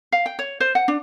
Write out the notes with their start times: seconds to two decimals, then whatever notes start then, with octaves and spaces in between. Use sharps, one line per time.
0.12 F5
0.26 G5
0.39 C#5
0.60 C5
0.75 F#5
0.88 D4